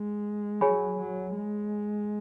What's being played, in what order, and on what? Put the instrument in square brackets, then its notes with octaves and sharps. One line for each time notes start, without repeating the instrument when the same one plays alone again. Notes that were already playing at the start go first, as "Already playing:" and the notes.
Already playing: [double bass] G#3
[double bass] F#3 [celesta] G#4 C#5 G#5 B5
[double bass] F#3
G#3